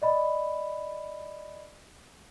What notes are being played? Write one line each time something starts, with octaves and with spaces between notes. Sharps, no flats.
D5 D#5 B5